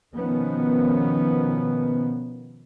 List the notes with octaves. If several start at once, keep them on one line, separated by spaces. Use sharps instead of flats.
B2 D#3 F3 B3 C#4